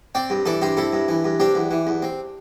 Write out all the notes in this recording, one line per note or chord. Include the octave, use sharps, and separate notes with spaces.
C4 D5 G5
G2
E3 A4 D5
G2 G4 C5
C4 E4 A4
G2
E3
G2
C4 D4 G4
E2
E3
E2
C4